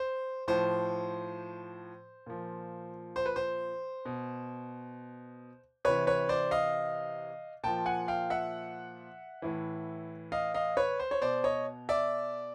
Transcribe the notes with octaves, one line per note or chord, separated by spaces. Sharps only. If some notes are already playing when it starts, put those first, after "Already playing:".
Already playing: C5
A2 F3 C5
A#2 F3
C5
B4
C5
B2
C3 E3 B4 C#5
B4 C#5
C5 D5
D#5 F5
A#2 F3 G5 A5
F#5 G#5
F5 G5
E5 F#5
A2 E3
D#5 F5
D#5 F5
B4 C#5
C5
C#5
B2 C5 D5
C#5 D#5
D5 E5